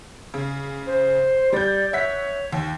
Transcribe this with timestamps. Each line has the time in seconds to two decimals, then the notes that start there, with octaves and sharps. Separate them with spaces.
0.34 C#3
0.87 C5
1.52 G3 D5 G6
1.93 C#5 E5 F#5 B6
2.53 D#2